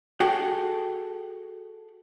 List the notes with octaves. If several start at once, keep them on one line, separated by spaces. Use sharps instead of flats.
F#4 G#4 A4 G5